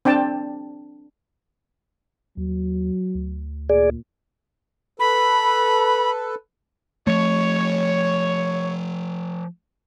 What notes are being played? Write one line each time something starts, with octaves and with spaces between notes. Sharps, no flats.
C4 D4 G5 A5
D#2 F#3
D2
A#2 G#4 D5
A4 B4 B5
F3 A3 C#5